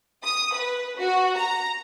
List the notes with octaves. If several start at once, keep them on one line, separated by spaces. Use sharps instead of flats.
D#6
B4
F#4
A#5